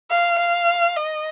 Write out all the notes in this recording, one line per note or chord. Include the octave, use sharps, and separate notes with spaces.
F5
F5
D#5